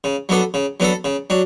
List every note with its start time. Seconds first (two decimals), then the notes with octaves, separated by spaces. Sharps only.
0.04 C#3
0.29 F#3 B3 D4 A4
0.54 C#3
0.80 F#3 B3 D4 A4
1.04 C#3
1.30 F#3 D4